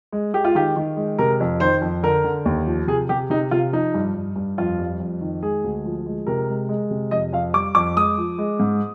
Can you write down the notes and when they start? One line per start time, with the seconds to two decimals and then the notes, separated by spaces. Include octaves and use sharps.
0.12 G#3
0.33 G#3 G4
0.45 F4
0.55 D#3 G4
0.76 D#3
0.97 G#3
1.19 C3 A#4
1.40 F2
1.60 D#3 C5
1.81 F2
2.03 D3 A#4
2.24 D3
2.45 D#2
2.66 F3
2.87 C3 G#4
3.09 C3 G4
3.30 C3 D#4
3.51 C3 F4
3.72 F3 D#4
3.94 G2
4.15 G2
4.36 G2
4.58 F2 F4
4.79 G3
5.00 F2
5.21 D#3
5.42 G#3 G#4
5.64 D2
5.85 F3
6.06 G#3
6.27 C3 A#4
6.49 G#3
6.69 G#3
6.91 C3
7.11 F2 D#5
7.32 F2 F5
7.54 G3 D6
7.75 F2 D6
7.96 G#3 D#6
8.18 F3
8.38 G#3
8.60 G#2